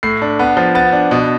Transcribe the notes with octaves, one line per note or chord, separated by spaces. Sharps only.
A2 C7
D4
B3
F3
B3 A6
D4
B2